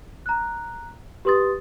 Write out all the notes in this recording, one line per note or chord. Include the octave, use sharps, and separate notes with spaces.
A#5 F#6
G4 B4 C6 D#6 A6